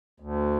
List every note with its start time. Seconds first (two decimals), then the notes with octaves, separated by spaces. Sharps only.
0.20 D2